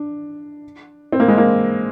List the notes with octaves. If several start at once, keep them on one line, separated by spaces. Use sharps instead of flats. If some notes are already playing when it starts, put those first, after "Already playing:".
Already playing: D4
C4
A#3
G#3
A#3